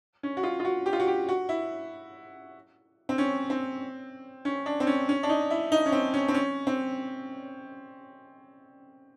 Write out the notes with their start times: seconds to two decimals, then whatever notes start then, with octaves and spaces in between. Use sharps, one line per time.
0.23 C#4
0.37 F#4
0.43 F4
0.60 F4
0.65 F#4
0.86 G4
0.93 F4
1.00 F#4
1.07 G4
1.28 F#4
1.49 E4
3.09 C4
3.18 C#4
3.50 C4
4.45 C#4
4.66 D4
4.80 C4
4.87 C#4
5.09 C#4
5.23 D4
5.29 D#4
5.50 E4
5.72 D#4
5.86 C#4
5.92 C4
6.14 C#4
6.28 C4
6.34 C#4
6.67 C4